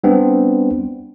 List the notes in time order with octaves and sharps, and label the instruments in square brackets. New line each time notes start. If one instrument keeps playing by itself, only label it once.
[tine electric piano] G3 B3 C4 D4